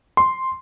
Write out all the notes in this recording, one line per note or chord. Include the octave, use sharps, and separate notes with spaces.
C6